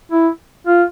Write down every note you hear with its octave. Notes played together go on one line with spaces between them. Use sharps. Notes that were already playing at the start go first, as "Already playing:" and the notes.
E4
F4